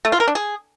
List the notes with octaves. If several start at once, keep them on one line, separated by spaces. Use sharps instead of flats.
A3
F4
A#4
D4
G#4